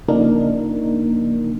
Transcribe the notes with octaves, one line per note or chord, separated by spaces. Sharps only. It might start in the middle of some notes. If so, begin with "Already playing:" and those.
C#3 F3 A#3 D4 D#4 A#4